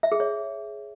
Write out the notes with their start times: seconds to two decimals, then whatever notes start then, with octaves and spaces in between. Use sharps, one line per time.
0.03 E5
0.12 G#4
0.20 C#5